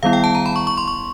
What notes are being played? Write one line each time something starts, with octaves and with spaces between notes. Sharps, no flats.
D#3 G3 B3 E4 F5
G5
A5
A#5
B5
C#6
C#6
C6
C#6